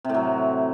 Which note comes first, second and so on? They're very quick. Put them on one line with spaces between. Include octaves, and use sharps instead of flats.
C3 A2 F#3